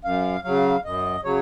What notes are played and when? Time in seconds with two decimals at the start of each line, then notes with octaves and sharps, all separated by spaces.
0.04 F#2 F5
0.44 C#3 F#3 F5
0.84 F#2 D#5
1.24 C#3 F#3 C#5